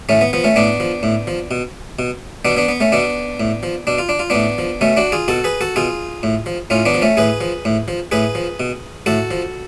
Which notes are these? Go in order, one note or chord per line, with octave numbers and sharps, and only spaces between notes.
A2 A3 C#4
B3
F3 B3
A3 C#4
A2 B3 D4
F3
A2
F3
B2
B2
B2 B3 D4
B3 D4
B3
A3 C#4
B2 B3 D4
A2
F3
B2 D4
F4
D4
F4
A2 B3 D4
F3
B2 A3 C#4
D4 F#4
F4 G#4
B2 F#4 A4
G#4 B4
F#4 A4
B2 F4 G#4
A2
F3
A2 C#4 F4
B3 D4
F3
A3 C#4
A2 G#4 B4
F3
A2
F3
A2 G#4 B4
F3
B2
A2 F#4 A4
F3